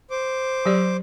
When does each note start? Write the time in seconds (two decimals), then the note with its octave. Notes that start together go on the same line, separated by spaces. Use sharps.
0.10 C5 D6
0.66 F#3 G4 D5